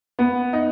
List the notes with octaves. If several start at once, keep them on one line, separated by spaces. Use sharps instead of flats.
B3
D#4